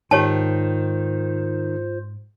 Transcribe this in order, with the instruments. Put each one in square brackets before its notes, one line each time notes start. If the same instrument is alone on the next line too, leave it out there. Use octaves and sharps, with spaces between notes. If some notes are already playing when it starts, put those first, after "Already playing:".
[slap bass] G#2 [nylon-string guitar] D#3 [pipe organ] F4 C5 [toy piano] G4 C#5 A5